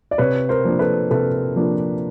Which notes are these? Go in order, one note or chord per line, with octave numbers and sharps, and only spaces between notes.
D5
C3 B4 C#5
A#4 C5
F3 A#3 D4
A4 B4
C3 A4 B4
F3 A#3 D4